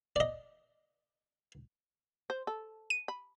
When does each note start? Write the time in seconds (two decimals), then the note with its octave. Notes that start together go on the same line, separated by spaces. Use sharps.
0.16 D5 D#5
2.30 C5
2.47 A4
2.90 D#7
3.08 B5